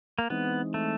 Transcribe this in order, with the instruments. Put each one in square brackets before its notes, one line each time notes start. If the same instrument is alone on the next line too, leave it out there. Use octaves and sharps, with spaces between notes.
[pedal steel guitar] A#3
[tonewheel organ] E3 G#3 C4 D#4 [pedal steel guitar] B3
[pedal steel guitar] A3